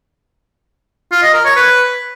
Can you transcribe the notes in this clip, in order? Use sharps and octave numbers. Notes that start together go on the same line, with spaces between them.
F4
D#5
A#4
C#5
B4